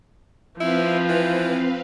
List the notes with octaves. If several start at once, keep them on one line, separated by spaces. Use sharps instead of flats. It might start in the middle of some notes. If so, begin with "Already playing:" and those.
F3 C4 E4 B4 F5
E3